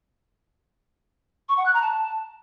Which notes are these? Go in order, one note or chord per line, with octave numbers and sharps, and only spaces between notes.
C#6
F#5
F#6
A#5
A5